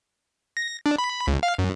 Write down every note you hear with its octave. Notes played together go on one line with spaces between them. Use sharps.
A#6
D4
B5
C#2
F5
F#2